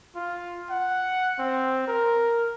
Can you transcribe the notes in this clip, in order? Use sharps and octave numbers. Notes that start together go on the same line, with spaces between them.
F4
F#5
C4
A#4